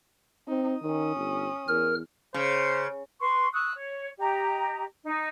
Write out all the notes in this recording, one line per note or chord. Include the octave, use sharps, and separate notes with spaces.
C4 D#4
D#3 C#4 D#6
G1
E2 A#4 F6
C#3 C5
B4 C6 C#6
C#6 D#6 E6 F#6
C#5
G4 D#5 A#5
D#4